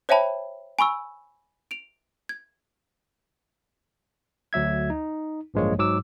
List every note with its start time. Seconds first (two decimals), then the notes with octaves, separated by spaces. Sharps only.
0.09 C5 C#5 E5 G5 A5 B5
0.79 G#5 B5 C#6 E6
1.71 D7 F7
2.29 G#6
4.53 D2 F#3 E5 G#6
4.90 D#4
5.54 A1 G2 F3 G#3 A#3 C#5
5.78 G#2 F#3 D6 E6